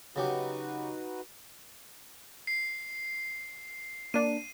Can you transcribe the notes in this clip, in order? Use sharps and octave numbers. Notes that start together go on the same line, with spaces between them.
C#3 F#3 D#4 F#4 G4 B4
C7
A#3 D4 D#7